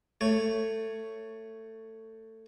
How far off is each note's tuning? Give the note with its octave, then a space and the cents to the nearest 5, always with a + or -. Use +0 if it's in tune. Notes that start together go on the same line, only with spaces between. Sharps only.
A3 +20 C#5 +0